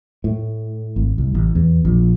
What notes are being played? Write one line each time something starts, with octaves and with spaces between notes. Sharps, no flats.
A2
G#1
C2
A1
E2
A#1